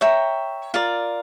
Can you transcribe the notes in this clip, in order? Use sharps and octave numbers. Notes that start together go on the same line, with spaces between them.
C#5 E5 G5 A#5
F4 A#4 D5